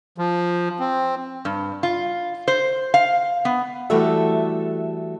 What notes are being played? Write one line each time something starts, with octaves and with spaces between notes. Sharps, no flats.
F3
C4
G2
F4
C5
F5
B3
E3 G3 A3 F#4 A4 E5